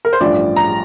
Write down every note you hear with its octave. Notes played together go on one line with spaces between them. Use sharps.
A#4
C5
A1 G2 F3 D5
A#5